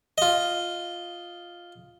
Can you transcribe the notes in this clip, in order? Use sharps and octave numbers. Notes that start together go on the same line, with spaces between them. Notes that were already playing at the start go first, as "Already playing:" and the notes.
F4 D#5